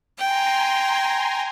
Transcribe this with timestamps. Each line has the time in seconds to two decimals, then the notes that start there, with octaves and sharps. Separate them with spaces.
0.18 G5 G#5 A#5 C6